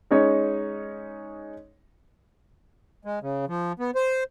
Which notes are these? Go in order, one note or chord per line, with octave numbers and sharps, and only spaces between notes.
G#3 C#4 D#4 C#5
G#3
C#3
F3
B3
C5